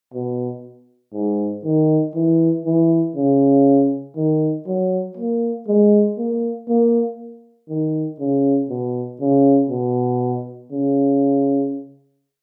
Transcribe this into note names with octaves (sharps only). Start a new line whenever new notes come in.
B2
G#2
D#3
E3
E3
C#3
D#3
F#3
A#3
G#3
A#3
A#3
D#3
C#3
B2
C#3
B2
C#3